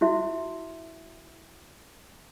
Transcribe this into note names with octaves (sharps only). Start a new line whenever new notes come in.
E4 F#4 E5